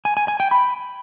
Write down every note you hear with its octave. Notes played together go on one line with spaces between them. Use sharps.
G#5
G#5
G#5
G5
B5